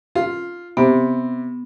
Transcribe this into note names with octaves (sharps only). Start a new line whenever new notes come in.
F4
C3 B3